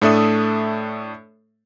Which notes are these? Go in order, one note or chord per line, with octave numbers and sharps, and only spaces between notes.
A2 A3 D4 A4 E5 D#6